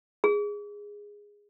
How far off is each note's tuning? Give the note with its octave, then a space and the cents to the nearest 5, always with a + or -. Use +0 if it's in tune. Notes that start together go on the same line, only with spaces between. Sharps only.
G#4 -10